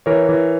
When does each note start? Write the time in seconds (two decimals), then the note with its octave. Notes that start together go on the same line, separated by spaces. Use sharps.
0.06 E3 A#4 C#5
0.29 E3